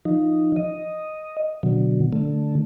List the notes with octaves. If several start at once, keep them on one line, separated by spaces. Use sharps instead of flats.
F3 D#4
D#5
B2 D3 F#3
D3 A3